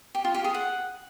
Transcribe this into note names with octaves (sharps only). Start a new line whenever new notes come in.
G4
F4
G4
G#4
F#5